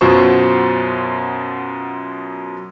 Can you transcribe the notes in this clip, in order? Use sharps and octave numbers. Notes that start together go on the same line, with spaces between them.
F#2 B2 F4 F#4 C5 C#6